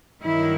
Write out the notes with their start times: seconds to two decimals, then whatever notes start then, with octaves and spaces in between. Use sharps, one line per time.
0.22 G2 D#3 F#3 E4